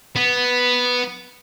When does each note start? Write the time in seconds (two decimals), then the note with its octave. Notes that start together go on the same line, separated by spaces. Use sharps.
0.16 B3